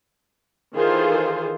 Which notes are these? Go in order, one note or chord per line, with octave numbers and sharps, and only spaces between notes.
D#3 E3 F4 G#4 A4 C5